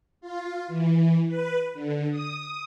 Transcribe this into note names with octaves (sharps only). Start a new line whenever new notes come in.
F4
E3
B4
D3
D#6